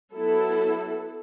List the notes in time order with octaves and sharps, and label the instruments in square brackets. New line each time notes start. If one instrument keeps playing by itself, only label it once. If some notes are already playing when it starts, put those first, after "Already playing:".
[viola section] F#3 B3 E4 A4